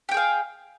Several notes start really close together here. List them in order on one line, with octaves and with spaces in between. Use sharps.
G4 G5 G#4 F5